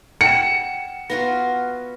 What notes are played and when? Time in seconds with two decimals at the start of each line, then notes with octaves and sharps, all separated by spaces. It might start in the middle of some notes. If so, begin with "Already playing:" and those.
0.21 F#5 G5 C#7 E7
1.10 B3 F4 F#4 A#6